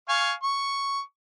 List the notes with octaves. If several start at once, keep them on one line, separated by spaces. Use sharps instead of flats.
F5 G#5 C#6
C#6